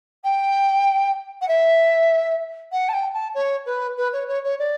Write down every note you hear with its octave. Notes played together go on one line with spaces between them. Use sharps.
G5
F#5
E5
F#5
A5
G5
A5
C#5
B4
B4
C#5
C#5
C#5
D5